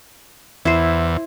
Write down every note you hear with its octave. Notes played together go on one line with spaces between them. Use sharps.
E2 E4 C5